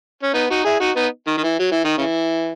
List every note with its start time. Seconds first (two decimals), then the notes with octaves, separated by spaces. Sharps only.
0.23 C#4
0.33 B3 D#4
0.50 D#4 F#4
0.64 E4 G#4
0.80 D#4 F#4
0.96 B3 D#4
1.27 D#3
1.37 D#3
1.44 E3
1.59 F#3
1.71 E3
1.84 D#3
1.98 C#3 E3